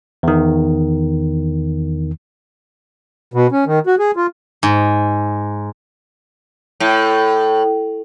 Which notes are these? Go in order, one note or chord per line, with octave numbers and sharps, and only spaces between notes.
E2 D#3
B2
C#4
D#3
F#4
G#4
F4
G#2
A2